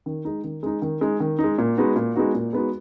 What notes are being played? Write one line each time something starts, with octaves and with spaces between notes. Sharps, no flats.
D#3
G#3 D#4
D#3
G#3 D#4
D#3
G#3 D#4
D#3
D#4
G#3
A#2
G#3 B3 D#4 F#4
A#2
G#3 B3 D#4 F#4
A#2
G#3 B3 D#4 F#4